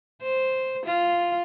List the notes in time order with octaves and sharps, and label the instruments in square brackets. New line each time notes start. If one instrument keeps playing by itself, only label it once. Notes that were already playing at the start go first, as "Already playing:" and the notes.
[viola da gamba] C5
F4